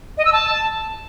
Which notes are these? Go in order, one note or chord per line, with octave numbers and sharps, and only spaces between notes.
D#5
E6
A5